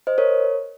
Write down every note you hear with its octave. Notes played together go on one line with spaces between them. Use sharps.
C5 D#5
A#4 C#5